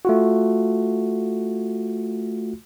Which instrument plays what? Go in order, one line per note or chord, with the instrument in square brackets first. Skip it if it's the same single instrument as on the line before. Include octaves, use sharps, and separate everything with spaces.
[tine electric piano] A3 F4 F#4